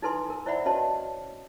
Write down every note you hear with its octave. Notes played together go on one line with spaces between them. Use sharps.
D#4 E4 A4 B4 G#5 C6
A#4
E4 C5 D5 E5 F#5 B5
C#4 F#4 B4 C#5 D#5 A5